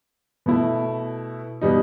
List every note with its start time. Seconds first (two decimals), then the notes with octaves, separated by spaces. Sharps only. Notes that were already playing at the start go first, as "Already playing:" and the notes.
0.46 B2 A3 E4
1.61 B2 G3 D#4